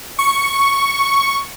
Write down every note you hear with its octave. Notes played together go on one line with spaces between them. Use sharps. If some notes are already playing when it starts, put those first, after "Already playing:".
C#6